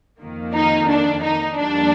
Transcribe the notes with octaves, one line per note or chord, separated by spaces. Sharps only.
F2 D#3 A#3
D#4
D4
D#4
F2 D#3 G3 A#3 D4